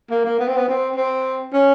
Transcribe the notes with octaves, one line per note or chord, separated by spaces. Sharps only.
A#3
A#3
B3
C4
B3
C4
C4
C#4